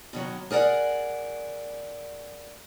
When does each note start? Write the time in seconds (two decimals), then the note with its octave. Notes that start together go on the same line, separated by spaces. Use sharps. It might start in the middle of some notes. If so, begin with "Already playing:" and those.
0.13 B2 D#3 F#3
0.51 G#4 A#4 D5 F#5